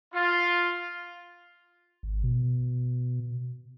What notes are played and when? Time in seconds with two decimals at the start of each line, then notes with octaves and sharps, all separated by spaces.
0.13 F4
2.03 G#1
2.24 B2